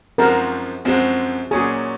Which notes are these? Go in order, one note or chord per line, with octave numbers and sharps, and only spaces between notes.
F#2 F3 G#3 C4 F#4 A#4
F#2 F3 G#3 C4 F#4
A#2 F#3 C#4 G#4